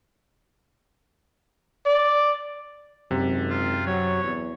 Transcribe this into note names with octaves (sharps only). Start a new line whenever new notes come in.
D5
G#1 F#2 C3
F4
F#3 C#5
E2